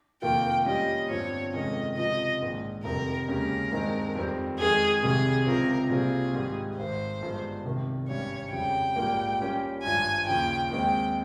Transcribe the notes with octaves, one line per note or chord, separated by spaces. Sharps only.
F1 F2 D#3 A#3 F4 G5
A#2 G3 C#4 G4 D#5
G1 G2 F3 C4 C#5
F1 F2 D#3 G#3 C#4 D#5
C#2 C3 F3 D#5
A#1 G#2 D#3
F1 F2 C3 D#3 G3 A#4
D#2 C#3 G#3 C#4 G4 A#4
G2 D#3 G#3 C4 D#4
F2 D#3 G3 C4
F2 D#3 G#3 G#4
C2 C3 D#3 G3 G#4
C#2 C3 F3 C4 F4 A#4
C2 A#2 G3 C4 F4 G#4
G#2 D#3 G3
G#1 G#2 D#3 C5
G1 G2 F3 G#3
C2 C3 D#3
G#1 G2 G3 C#4 C#5
F2 C#3 G3 G5
A#1 G#2 G3 A#3 F4
A#2 G3 A#3 C#4
G#1 G2 F3 G#5
D#2 C#3 F3 G5
D#2 D#3 G#3 C4 D#4 G5